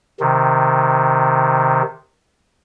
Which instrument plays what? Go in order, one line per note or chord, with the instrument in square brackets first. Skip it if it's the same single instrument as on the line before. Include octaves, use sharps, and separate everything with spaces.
[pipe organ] C3 D#3